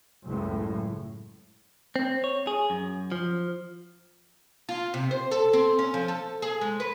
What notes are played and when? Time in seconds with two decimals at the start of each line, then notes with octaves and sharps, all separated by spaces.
0.24 F#1 C#2 A2
1.96 C4
2.24 C#5
2.47 G#4
2.70 F#2
3.12 F3
4.69 F4
4.94 C3
5.11 C5
5.31 A4
5.53 C4
5.79 C#4
5.94 F3
6.08 A4
6.42 G#4
6.61 G#3
6.80 B4